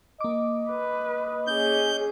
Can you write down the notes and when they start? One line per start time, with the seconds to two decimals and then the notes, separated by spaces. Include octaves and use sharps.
0.21 A#3 D#5 D6
0.69 B4
1.47 C#4 G#4 G6